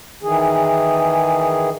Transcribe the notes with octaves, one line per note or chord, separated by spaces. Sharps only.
D#3 E3 G#4